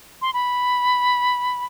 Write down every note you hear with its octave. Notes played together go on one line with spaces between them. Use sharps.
C6
B5